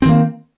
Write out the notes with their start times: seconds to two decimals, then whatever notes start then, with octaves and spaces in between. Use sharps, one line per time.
0.02 C4
0.06 D#3
0.09 A#3